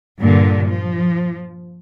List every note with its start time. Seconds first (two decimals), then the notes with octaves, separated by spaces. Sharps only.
0.19 G2 A#2 D3
0.68 F3